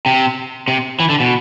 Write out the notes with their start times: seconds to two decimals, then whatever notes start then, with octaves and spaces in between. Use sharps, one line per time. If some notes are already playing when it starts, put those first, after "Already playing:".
0.06 C3
0.68 C3
1.00 E3
1.10 D3
1.20 B2